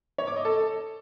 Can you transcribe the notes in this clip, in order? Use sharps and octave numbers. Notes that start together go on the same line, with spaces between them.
C#5
D6
D#5
A4